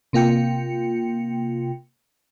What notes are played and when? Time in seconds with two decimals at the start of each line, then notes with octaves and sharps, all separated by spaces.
0.13 C3 A#3 F4 G5 C#7